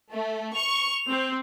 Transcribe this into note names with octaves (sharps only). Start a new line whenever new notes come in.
A3
C#6 F7
C4